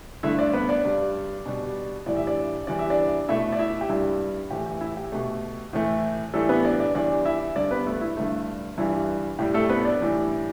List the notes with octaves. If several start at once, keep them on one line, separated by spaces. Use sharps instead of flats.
G2 D3 A3 E4 E5
D4 D5
B3 B4
D4 D5
G2 G3
B2 G3
A2 E3 G3 D5
E5
D4 D5
E2 E3 G3 D5
E5
D4 D5
B2 A3 E4 E5
D5
E4 E5
G4
G2 G3 E4
A2 E3 A3 G4
G4
E4
G4
B2 A3
A2 E3 A3
A2 E3 G3 A3 A4
B3 B4
D4 D5
D4 D5
E2 E3 G3 D4 D5
E4 E5
G2 D3 G3 D4 D5
B3 B4
A3 A4
E4
G2 D3 A3
G2 E3 G3 E4
A2 G3 G4
A3 A4
B3 B4
D4 D5
A2 E3 G3